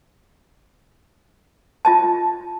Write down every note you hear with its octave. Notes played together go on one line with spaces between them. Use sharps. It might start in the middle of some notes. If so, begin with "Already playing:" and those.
F4 D#5 A5